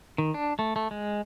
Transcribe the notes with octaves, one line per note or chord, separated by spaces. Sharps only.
D#3
D4
A3
A3
G#3